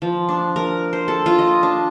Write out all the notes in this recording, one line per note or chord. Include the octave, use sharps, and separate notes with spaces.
F3
D4
A#4
C5
A4
F4
D#5
D4